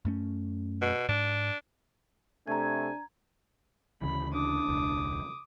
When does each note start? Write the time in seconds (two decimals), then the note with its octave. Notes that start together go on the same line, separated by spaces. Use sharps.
0.05 F#2 A3 C#4
0.82 B2
1.09 G#2 D4
2.48 C3 A3 D4 G#5 A#5 G#6
4.02 D2 C#3 E3 B5
4.33 D4 D6 D#6
4.68 E1 C#2